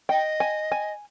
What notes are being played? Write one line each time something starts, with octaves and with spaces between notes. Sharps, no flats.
D#5 G5
G#5
G#5